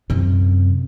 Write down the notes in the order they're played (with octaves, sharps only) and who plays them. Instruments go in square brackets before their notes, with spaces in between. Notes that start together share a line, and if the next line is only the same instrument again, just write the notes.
[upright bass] F#2 C3